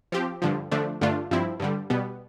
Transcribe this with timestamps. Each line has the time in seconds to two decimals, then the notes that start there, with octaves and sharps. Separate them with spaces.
0.12 F3 C4 G4
0.42 G2 D3 F3
0.71 D3 F3 A3 D4
1.01 G2 D3 A3 D4 F4
1.31 G2 F3 C4 E4
1.60 G2 D3 G3
1.90 B2 G3 B3